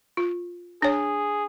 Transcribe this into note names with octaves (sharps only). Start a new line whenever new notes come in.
F4
D4 G#4 C#5